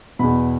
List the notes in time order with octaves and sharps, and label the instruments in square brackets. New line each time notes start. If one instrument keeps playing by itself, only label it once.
[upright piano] E2 B2 B5